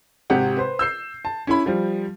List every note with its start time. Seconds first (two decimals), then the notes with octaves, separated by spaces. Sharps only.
0.30 G#1 C3 G4 F#5
0.57 B4 C5
0.79 E6 G6 C7
1.25 A5
1.47 C#4 E4 B5
1.66 F3 G3